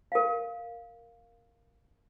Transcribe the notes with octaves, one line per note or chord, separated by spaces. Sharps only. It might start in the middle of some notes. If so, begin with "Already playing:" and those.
A#4 F5